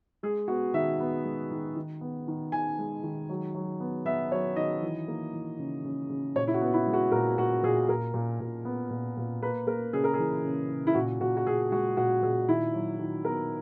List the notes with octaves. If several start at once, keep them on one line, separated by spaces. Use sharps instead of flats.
G#3 G#4
B3 F#4
D#3 E5
B3
G#3
D#3
D#3
B3
D#3
D#3 G#5
G#3
D#3
F#3
F#3
B3
B3 E5
F#3 C#5
D#3 D#5
E3
A#3
E3
C#3
C#3
C#3
A#2 C#5
E4
F#4
B3
E4
G#3
F#4
A#2 A#4
A#2 F#4
A#2 G#4
A#2 A#4
A#2
A#2
B3
A#2
A#2
A#3 B4
A#3 A#4
C#3 G#4
A#4
G#4
E3
C#3
C#3
E4
A#2 F#4
A#2 F#4
F#4
A#2 G#4
G#3 F#4
A#2 F#4
A#2 G#4
D#3 E4
F#3
D#3
B3 A#4